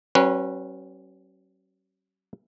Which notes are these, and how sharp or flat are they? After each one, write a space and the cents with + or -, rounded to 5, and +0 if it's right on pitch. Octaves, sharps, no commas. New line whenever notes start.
F#3 +40 C#4 -30 B4 -10